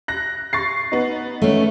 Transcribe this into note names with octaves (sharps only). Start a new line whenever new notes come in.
F#6 A#6
C#6 A6 C7
B3 D#4
A3 C#4